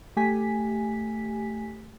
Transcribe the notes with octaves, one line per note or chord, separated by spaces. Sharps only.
A3 G4 G#5 B6